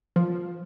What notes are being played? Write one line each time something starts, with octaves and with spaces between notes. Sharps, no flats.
F3